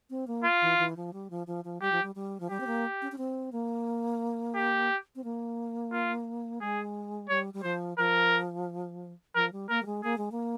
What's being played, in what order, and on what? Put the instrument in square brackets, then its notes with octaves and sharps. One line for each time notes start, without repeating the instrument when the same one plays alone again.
[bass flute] C4
A#3
[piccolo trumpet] F4
[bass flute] E3
E3
F3
G3
F3
F3
F3
[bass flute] G3 [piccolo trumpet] G4
[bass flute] F3
G3
G3
F3
[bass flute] G3 [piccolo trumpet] G4
[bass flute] C4
A#3
C#4
C#4
C4
A#3
[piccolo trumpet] G4
[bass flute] C4
A#3
[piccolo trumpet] F4
[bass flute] G#3 [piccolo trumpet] G#4
[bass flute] G3 [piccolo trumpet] C#5
[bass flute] G3
[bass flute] F3 [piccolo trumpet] C5
[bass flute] F3 [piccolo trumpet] A#4
[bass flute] F3 [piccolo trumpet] A#4
[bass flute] G3
[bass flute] A#3 [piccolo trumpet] A#4
[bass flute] G3
G#3
[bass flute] A#3 [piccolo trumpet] G#4
[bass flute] G#3
A#3